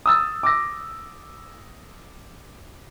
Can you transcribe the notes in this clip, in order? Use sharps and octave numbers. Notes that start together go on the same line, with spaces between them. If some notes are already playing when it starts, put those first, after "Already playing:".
D#6 E6 A6
D6 E6 A#6